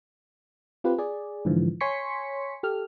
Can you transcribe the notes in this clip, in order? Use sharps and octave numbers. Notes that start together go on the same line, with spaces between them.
C4 F4 G4 B4
G#4 D5
G#2 D3 E3 F3
C#5 G#5 C6 C#6 B6 C#7
G4 A4 F6